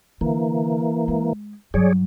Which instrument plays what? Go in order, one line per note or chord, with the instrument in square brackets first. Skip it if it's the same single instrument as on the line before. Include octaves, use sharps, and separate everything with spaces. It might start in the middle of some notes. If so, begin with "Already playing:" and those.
[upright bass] D3 [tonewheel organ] E3 A#3
[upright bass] G#3
[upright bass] G2 F#3 [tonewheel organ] G#4 C#5 D5